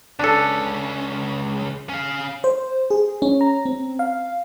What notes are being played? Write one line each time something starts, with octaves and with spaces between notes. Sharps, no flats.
C#2 C#4 D4 A4
C#4 F5
C5
G#4
C#4
A#5
C4
F5